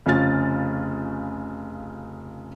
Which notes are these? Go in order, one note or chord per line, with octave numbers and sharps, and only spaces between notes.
F1 C#3 C#4 F4 F6 A6